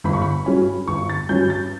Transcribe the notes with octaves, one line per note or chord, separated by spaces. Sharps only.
G1 B5
C#6
B5
G2 F#3 C#4
G1 C#6
A6
G2 F#3 C#4 G6
A6